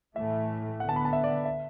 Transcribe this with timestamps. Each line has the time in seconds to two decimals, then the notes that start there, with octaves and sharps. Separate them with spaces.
0.15 A2 E3 A3 E5
0.80 D3 B3 F#5
0.89 A5
0.96 B5
1.05 A5
1.13 E5
1.24 D5
1.45 E5